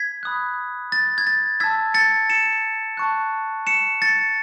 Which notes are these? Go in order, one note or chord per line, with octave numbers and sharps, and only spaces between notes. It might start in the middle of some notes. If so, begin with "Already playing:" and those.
Already playing: G#6 B6
B5 D#6 F#6
A6
G#6
A6
A5 E6 G#6 B6
A6 C#7
C#7 E7
A5 C#6 F#6
C#7 E7
A6 C#7